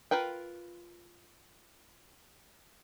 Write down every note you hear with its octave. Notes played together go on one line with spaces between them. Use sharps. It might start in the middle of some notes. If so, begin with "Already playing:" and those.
F4 A#4 B4 G5